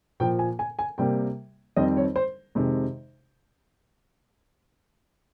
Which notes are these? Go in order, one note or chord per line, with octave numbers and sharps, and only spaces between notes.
A#2 F3 A#3 G5
G#5
G#5
G#5
C3 G3 A#3 G5
F2 D#3 G3 C4 D#5
C#5
C5
F2 C3 D#3 G#3